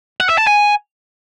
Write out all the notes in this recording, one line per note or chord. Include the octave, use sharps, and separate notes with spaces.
F#5
E5
A5
G#5